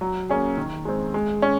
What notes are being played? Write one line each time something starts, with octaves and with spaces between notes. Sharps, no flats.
F#3
A#3 C#4 G#4
D#3
G#3 C4
G#3
C#4